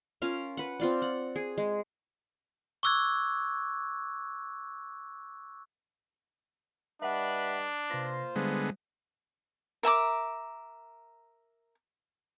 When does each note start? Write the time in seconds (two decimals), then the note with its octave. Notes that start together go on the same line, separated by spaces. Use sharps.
0.22 C#4 F4 A#4 F5
0.57 B4 F#5
0.80 C4 F4 D5
1.02 F#5
1.36 G#4
1.58 G#3
2.83 C#6 D6 E6 F#6 G#6
7.02 G3 D4 B4 D#5 E5 F#5
7.90 C3 A#3 F4 B4 C5 A#6
8.36 D3 G3 G#3 B3
9.83 A#4 E5 A#5 D6